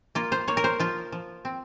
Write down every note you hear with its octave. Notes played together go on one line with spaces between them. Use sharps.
A#3 F4
C5
A#3 C#5
A#4
C5
F3 F4
F3
C4